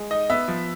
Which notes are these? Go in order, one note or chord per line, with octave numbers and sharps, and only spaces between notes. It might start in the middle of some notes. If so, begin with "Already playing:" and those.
Already playing: G#3
D#4 D#5
B3 E5
F3